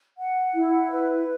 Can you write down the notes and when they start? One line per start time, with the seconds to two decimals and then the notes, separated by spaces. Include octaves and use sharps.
0.18 F#5
0.54 E4
0.90 B4